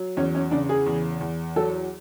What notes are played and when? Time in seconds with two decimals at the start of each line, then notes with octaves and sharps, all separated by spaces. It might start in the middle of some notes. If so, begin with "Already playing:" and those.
Already playing: F#3
0.17 E2 C#4
0.35 C#4
0.51 C#3 D4
0.69 G#4
0.86 E2
1.21 E2
1.56 F#3 A4